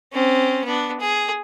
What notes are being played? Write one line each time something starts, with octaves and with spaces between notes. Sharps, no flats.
C4 C#4
B3 D4
G#4